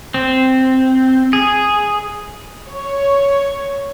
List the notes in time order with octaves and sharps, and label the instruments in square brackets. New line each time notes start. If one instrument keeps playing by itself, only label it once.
[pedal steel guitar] C4
G#4
[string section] C#5